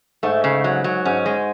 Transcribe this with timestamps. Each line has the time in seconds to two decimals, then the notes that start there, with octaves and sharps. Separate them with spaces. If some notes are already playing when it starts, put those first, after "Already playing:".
0.23 G#2 A3
0.44 C#3
0.64 F#3
0.84 F#3
1.05 G#2 C#4
1.26 G#3